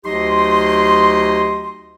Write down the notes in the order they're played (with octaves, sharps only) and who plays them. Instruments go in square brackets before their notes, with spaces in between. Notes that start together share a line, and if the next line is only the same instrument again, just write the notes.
[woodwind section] D2 F#3 D#4 G4 D#5 C6